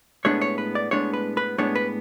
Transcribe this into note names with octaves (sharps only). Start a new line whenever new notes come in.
A2 G#3 B3 D4 C#5
C#5
B4
D5
A2 G#3 B3 D4 C#5
B4
B4
A2 G#3 B3 D4 C#5
B4